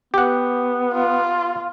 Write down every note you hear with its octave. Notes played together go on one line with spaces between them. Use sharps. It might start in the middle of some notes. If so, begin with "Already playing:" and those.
B3 G4 F#5
F4